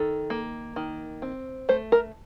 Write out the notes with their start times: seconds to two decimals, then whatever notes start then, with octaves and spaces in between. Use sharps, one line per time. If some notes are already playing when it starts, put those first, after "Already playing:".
Already playing: D#3 A4
0.30 A#3
0.76 D#3
1.22 C4
1.69 A3 C5
1.92 A#4